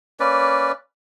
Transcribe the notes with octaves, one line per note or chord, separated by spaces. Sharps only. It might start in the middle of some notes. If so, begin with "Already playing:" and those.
A#3 C#4 B4 D5